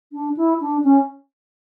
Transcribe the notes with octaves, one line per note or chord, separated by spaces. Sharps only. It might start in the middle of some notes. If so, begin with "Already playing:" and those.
D4
E4
D4
C#4